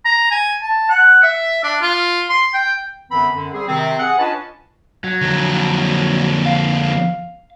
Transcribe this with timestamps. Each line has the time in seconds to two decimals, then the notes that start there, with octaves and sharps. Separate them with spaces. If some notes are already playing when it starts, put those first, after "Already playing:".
0.05 A#5
0.31 G#5
0.62 A5
0.89 F#5
1.23 E5
1.64 D4
1.82 F4
2.29 C6
2.54 G5
3.11 F#2 D3 E3 B3 C4 B5
3.34 F#2 D3
3.53 G3 C4 G#4
3.68 C3 D#3 C4
4.00 G#4 F#5
4.18 C#4 D4 F4 B4 D#5 A5
5.04 F#3
5.21 F2 D3
6.46 F5